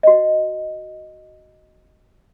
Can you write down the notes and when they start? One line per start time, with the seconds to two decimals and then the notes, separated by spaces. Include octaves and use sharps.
0.03 F#4 D#5